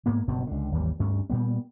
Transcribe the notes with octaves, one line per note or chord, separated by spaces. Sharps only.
G#2 A#3 B3
F#1 G2 B2 C4
C#2 D3
G#1 D#2 E3 G3
D2 G2 A3 C#4
A#2 G3 B3